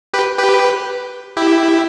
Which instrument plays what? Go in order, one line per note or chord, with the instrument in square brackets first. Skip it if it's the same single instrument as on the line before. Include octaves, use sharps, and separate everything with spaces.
[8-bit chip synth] G4 B4
G4 B4
E4 G4